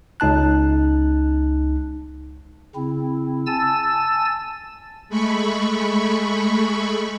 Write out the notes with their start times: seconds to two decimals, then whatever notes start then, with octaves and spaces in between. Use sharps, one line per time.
0.20 C#2 D#4 A5 F#6
2.75 C#3 C4 E4
3.47 G#5 A5 E6 A6
5.09 G#3 A3 B5 C#6